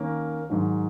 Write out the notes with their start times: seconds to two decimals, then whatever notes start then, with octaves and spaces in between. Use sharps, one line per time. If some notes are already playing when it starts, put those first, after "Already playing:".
Already playing: D#3 A#3 C#4
0.50 G#2 D#3 F#3